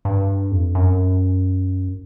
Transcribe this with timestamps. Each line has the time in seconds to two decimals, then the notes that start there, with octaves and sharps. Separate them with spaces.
0.05 G2
0.51 F2
0.75 F#2